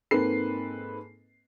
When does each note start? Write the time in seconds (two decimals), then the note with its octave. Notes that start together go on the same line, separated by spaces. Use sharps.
0.11 G#2 A#3 C4 A4 B4 C7